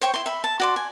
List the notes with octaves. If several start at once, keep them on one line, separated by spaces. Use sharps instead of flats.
C5 C#5 G5 C#6
E4 C6
E5 B5
A5
F#4 D5 C6
G#5